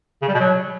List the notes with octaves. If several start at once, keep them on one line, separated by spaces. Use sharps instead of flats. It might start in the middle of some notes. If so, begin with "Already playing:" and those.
C#3
G3
B2
F#3